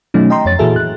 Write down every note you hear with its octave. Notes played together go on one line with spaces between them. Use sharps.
B2 D#3 F#3 A3 C#4 D#4
D#5 G5 A#5 C6
F2 C#5 A6
A#2 E3 F#4 G#4 A4 E5
F#6